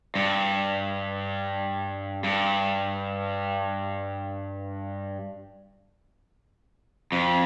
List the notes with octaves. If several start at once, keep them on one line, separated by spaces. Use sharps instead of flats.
G2
G2
F2